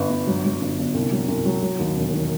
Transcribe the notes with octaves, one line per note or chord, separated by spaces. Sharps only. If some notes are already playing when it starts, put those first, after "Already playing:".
Already playing: G1 F#2 B3
G1
F#3
F#3
G1
G1
C2
F#3
C2
F#3
F#3
D#2
E1
D#3